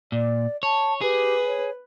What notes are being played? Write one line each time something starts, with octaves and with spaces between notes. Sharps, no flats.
A#2 D5
C#5 A5
G4 G#4 B4
C#5